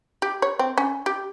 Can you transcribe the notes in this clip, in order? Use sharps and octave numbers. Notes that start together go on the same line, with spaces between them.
G4
C#5
C4
C#4
G4